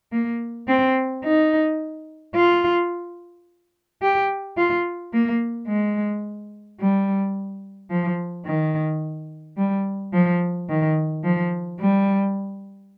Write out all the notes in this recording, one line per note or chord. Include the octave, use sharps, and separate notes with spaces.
A#3
C4
D#4
F4
G4
F4
A#3
G#3
G3
F3
D#3
G3
F3
D#3
F3
G3